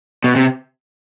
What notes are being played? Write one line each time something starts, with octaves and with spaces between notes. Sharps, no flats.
B2
C3